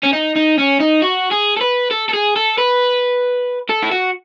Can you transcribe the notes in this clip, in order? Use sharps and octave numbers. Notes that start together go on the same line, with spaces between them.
C#4
D#4
D#4
C#4
D#4
F#4
G#4
A4
B4
A4
A4
G#4
A4
B4
A4
E4
F#4